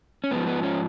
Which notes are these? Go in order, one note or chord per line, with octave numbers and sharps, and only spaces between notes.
C#4
G#2 F3 B3
B3
C#4